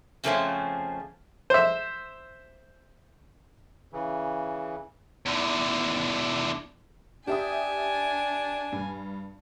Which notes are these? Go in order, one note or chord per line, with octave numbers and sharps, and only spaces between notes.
F2 C#3 F3 A3 C4 C#4
C5 E5
C#3 E3
E2 D3
D4 G4 E5 G#5 D#6
G2